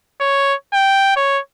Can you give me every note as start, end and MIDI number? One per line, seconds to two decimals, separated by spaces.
0.21 0.54 73
0.74 1.14 79
1.16 1.40 73